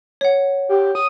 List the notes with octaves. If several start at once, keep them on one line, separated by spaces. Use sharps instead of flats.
C#5 F#5
G4
D#6